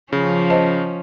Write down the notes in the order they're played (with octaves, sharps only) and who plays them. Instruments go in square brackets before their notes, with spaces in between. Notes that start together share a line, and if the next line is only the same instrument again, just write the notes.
[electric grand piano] C#3 [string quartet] F3 C#4
[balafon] C5 D#5 A5